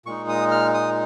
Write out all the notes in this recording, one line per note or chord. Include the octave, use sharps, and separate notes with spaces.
A#2 G#3 D#4 C#6
D#6
F6
D#6